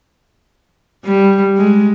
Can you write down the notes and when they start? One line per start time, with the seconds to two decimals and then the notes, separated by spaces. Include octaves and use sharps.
1.05 G3
1.57 G#3